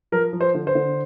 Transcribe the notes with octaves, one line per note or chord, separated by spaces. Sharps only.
F3 A#4
F3
C5
D3
C5
D3